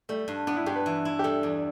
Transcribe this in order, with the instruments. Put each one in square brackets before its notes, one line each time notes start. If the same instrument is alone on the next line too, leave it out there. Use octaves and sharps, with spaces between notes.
[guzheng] G3 [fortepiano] A3
[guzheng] G2
[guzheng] B3 [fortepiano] D4
[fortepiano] E4
[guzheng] G2 [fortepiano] G4
[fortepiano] B4
[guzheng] E3
E4
[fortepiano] G4
[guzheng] G3 [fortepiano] A4
[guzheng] E2